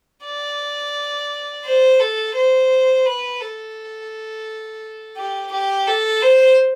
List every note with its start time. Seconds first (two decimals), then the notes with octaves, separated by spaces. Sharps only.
0.25 D5
1.65 C5
2.00 A4
2.35 C5
3.06 B4
3.41 A4
5.17 G4
5.52 G4
5.87 A4
6.22 C5